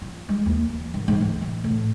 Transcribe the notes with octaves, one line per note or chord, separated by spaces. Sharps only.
F4
G#3
D#2
E3
G#1
G#2
D2
A1
A2